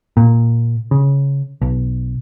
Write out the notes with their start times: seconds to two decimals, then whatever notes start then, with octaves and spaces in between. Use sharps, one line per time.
0.17 A#2
0.91 C#3
1.62 B1